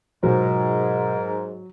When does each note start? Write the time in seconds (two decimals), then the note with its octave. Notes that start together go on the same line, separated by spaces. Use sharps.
0.23 G#2 B2 F#3 F4 A#4